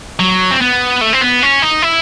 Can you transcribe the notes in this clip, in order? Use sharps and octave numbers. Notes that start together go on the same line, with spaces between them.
F#3
C4
B3
A3
C4
B3
C#4
D#4
E4